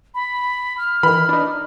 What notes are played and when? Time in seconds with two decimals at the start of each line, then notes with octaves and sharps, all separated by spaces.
0.14 B5
0.78 F6
1.03 D#3 E3 B5
1.29 D4 D#4